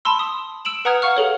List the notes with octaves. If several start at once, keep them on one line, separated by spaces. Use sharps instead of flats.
A5 B5 C6 E6
D#6
E6 D7 E7 F#7
B4 F#5 A#5 D#6 F6 G#6
F5 F#5 C#6 F6
G#4 A4 C#5